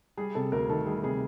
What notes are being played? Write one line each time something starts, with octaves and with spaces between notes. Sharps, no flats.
G3 G#4
C3 A4
D2 A#4
D#3 A4
G3 G#4
C3 G#4